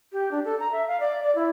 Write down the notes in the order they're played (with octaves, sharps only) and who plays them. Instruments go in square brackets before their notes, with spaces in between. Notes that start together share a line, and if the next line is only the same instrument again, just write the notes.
[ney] G4
D4
A4
A#5
E5
F5
D5
D5
E4